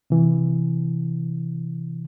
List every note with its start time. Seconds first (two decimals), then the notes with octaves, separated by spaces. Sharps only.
0.10 C3 E3